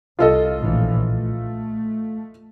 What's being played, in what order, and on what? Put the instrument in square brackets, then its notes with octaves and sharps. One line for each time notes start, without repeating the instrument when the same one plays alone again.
[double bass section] C2 [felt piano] F4 A4 D#5
[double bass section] A#1 A2 E3
A3